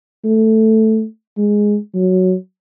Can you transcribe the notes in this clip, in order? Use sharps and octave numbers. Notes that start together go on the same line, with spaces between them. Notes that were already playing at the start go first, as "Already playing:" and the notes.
A3
G#3
F#3